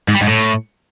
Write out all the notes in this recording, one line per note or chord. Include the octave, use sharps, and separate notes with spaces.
G#2
G3
G#2
A2